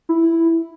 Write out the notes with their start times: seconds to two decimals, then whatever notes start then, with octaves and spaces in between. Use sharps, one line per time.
0.09 E4